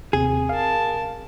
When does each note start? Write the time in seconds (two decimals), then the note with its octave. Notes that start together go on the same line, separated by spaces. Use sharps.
0.13 D#2 C3 C4 G#4
0.49 A#4 F5 A5